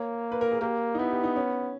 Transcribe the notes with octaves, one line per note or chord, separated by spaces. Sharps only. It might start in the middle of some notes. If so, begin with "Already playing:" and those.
Already playing: A#3 C#5
B4
A#4
G#4
A#3 G4
D#4
B3 E4
G4
D#4
C#4